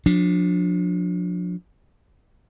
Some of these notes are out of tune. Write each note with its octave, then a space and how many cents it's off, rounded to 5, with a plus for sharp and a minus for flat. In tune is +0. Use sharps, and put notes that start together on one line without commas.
F3 +35 D4 +0